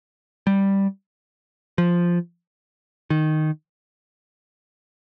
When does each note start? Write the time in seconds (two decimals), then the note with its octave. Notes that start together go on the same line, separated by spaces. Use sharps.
0.47 G3
1.78 F3
3.10 D#3